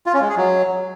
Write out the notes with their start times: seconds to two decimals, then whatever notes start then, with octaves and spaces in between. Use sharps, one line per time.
0.06 F4
0.14 C#4
0.21 G#3
0.29 G#4
0.37 F#3